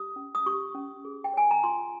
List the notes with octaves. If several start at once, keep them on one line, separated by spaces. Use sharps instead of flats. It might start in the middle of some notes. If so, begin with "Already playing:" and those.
Already playing: G4 D#6
C#4
D#6
G4 C#6
C#4
G#4
G5
C#5 G#5
A#5
F4 C6